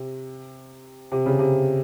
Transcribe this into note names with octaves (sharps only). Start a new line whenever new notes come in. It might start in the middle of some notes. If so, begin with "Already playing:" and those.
Already playing: C3
C3
C#3
C3